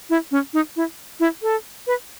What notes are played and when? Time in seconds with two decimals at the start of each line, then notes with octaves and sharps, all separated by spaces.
0.10 E4
0.31 C#4
0.53 D#4
0.76 E4
1.20 E4
1.42 A4
1.87 B4